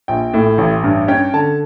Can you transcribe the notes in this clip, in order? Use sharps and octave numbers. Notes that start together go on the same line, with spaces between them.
A#1 G5
A2
A1
G2
C#4 G5
D3 A5